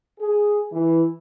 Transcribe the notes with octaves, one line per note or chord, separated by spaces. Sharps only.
G#4
E3